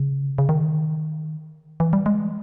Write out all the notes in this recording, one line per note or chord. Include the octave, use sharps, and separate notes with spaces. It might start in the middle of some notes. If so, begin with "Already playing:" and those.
Already playing: C#3
C#3
D#3
E3
G3
G#3